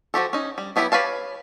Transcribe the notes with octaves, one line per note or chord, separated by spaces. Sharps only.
F3 F#4 G4 A4
C#4 D#4
G3
F#3 B3 E4 G4 B4
G4 B4 C#5 F5 A5